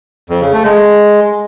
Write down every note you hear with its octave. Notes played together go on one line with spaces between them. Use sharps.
F2
C#3
A3
G#3